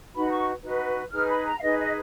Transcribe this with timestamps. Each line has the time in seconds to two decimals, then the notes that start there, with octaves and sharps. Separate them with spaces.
0.14 D#4 F#4 B4 B5
0.30 C#6
0.63 D#4 F#4 B4
1.11 D#4 G#4 B4 F6
1.29 B5
1.45 A#5
1.57 F5
1.61 D#4 G#4 B4 D#5
1.78 D#5